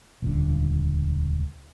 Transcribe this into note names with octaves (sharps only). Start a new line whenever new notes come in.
D#1 C#2 D3